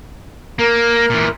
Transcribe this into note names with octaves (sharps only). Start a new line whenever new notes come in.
A#3 A#4
A#2 E3